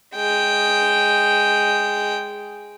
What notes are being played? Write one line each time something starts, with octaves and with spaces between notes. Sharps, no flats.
G#3 G5